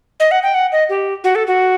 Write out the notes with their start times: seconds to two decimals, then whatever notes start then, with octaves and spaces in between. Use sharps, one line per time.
0.20 D#5
0.31 F#5
0.43 G5
0.54 F#5
0.72 D#5
0.89 G4
1.24 F#4
1.35 A4
1.47 F#4